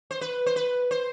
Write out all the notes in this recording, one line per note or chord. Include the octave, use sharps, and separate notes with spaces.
C5
B4
C5
B4
C5